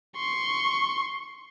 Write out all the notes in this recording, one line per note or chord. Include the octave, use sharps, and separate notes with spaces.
C6 C#6